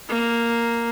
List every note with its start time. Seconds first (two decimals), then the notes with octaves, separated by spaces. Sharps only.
0.09 A#3